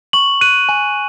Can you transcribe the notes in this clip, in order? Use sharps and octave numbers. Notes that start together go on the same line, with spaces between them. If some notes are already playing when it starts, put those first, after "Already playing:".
C#6 F#7
F#6 D#7
G#5